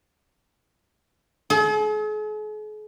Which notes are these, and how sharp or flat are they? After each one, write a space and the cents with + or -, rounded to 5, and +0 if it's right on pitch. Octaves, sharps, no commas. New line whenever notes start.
G#4 +45